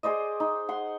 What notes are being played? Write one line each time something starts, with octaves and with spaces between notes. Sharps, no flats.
G#4 C5 D5 D#5
D#4
F#5 C6